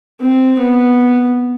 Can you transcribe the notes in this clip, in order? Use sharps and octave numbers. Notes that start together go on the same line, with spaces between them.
C4
B3